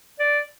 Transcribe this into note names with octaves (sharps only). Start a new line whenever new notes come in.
D5